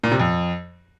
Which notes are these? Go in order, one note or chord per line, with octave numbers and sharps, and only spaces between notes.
A#2
C3
F2